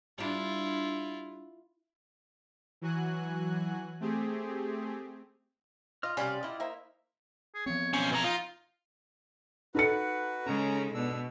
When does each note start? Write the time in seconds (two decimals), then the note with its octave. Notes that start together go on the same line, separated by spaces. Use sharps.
0.18 G3 D4 E4 F4
2.81 E3 F#3 F#4 G#5 F#6
4.01 A3 C4 G4 G#4
6.03 F4 D#5 F6
6.17 C3 G3 C#4 F4 G4 D5
6.43 E4 D#5
6.60 A#3 C5 E5
7.55 G#4
7.66 F3 B3 C4 C#5
7.93 B1 C#4 C5
8.12 B2 G#5 A#5
8.24 D#4 F4
9.75 D#4 F#4 A4 B4 C#7
10.46 C#3 G#3 C#4 A#5
10.94 B2 D4 E6